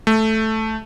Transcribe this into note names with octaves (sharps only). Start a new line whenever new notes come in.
A3